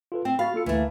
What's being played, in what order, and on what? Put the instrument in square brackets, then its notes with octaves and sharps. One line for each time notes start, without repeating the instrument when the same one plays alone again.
[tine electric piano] F4 A4 B4
[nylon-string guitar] C4 [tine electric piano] G5
[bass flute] F#4 [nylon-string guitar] F5 [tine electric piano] B5 A6
[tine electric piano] A#3 F4 C#7 [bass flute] A4
[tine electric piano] D2 [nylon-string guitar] E3 A3 [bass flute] A#3